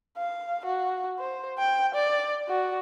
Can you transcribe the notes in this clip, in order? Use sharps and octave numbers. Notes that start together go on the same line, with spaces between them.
F5
F#4
C5
G5
D5
F#4